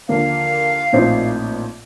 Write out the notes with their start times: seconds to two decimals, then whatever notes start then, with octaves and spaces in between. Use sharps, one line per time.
0.08 D#2 D3 F3 A#3 F5
0.93 A#1 A2 F3 C4 D#4